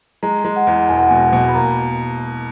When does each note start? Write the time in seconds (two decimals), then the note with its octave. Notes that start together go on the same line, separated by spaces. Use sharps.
0.23 G#3 A#5
0.45 G#3
0.56 F#5
0.67 E2
0.89 E1 G#5
0.99 F#5
1.09 B2 G#5
1.33 B2
1.49 B5
1.55 A#3 A#5